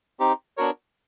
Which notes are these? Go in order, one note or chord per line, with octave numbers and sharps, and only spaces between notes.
C4 D#4 G4
B3 D4 F#4 A#4 C#5